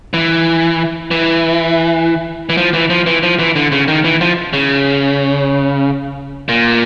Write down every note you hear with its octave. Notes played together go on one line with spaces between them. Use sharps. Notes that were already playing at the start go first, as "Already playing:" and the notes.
E3
E3
E3
F3
E3
F3
E3
F3
E3
D3
C#3
D#3
E3
F3
C#3
A#2